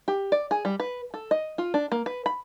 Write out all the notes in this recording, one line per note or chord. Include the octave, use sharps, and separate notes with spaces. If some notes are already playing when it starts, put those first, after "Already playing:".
G4
D5
G#4
G3
B4
A4
D#5
F4
D4
A#3
B4
B5